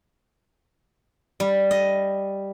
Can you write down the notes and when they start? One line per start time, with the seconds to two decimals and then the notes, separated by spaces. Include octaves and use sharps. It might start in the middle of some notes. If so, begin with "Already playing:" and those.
1.40 G3
1.71 D#5